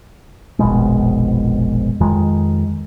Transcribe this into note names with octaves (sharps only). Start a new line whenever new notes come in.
F1 A#1 B2 G#3
F2 D#3 G#3